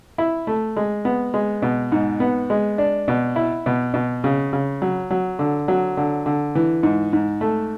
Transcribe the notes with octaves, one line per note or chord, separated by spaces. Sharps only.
E4
A3
G#3
B3
G#3
B2
G#2
B3
G#3
D4
B2
E4
B2
B2
C#3
C#3
F#3
F#3
D3
F#3
D3
D3
E3
G#2
G#2
A3